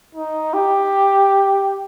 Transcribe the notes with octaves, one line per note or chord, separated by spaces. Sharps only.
D#4
G4